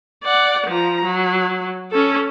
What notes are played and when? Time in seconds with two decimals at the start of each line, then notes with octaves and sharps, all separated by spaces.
0.23 D5 F#5
0.66 F3 A#5
1.04 F#3
1.91 C#4 A4